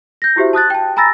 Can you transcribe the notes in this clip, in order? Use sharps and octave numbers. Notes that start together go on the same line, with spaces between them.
G6 A#6
E4 F#4 G4 C5 E5
A5 D#6 F#6 A6
G5 A5
G#5 A#5 B5 E6 A6 A#6